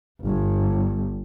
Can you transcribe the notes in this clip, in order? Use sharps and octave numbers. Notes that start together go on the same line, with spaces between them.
G1